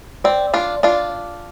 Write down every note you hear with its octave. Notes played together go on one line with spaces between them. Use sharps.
C4 D5
D4 F4 D5
D4 F4 D5